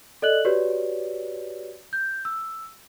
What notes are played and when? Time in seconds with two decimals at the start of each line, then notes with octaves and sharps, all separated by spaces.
0.22 A4 D5 D#5 F#6 F#7
0.45 F#4 G4 B4 C#5 D5
1.93 G6
2.25 E6